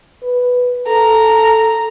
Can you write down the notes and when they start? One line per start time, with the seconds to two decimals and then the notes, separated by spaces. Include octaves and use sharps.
0.23 B4
0.88 A4 A#5